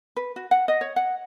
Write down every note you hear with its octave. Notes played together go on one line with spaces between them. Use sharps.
B4
F#4
F#5
D#5
C#5
F#5